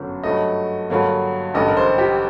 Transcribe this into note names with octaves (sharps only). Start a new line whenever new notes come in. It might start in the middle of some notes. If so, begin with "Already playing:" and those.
Already playing: G1 F#2 D3 F#3
G2 F#3 A3 D#5
G2 D3 F#3 A#3
A1 G2 D3 D#5
A#4
C5
G4